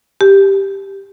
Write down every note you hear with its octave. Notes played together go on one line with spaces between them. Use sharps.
G4